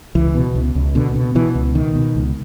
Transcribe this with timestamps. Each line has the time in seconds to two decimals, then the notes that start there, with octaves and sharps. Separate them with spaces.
0.15 C#2 E3
0.35 B2
0.55 C#2
0.75 C#2
0.95 B2 D3
1.16 B2
1.35 B2 E3
1.55 C#2
1.75 B2 D#3
1.95 B2
2.15 C#2